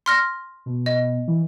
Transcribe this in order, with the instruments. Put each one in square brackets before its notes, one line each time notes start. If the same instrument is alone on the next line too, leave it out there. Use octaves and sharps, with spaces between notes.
[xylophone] C6 F6 A#6
[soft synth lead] B2
[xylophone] D#5
[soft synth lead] E3